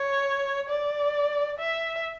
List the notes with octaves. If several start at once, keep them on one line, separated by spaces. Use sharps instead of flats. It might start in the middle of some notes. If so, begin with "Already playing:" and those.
Already playing: C#5
D5
E5